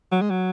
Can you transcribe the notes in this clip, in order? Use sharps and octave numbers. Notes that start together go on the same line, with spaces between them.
F#3
G#3
F#3